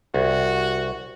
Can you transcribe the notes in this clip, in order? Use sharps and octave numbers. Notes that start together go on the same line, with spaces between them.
C2 F#4